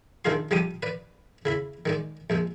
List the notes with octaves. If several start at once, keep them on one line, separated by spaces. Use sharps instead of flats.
C3 D#3 D4 F4 G#4 C6
C3 F3 G3 G4 D6 D#6
B4 D5
C#3 E4 B5
D#3 G#3 D5
A#1 C3 G#3